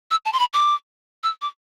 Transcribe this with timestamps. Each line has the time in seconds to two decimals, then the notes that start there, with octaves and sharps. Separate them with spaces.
0.11 E6
0.25 A5
0.33 C6
0.39 B5
0.53 D6
1.23 E6
1.42 D6